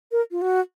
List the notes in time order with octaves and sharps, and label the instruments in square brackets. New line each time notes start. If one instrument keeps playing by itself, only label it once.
[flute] A#4
F4
F#4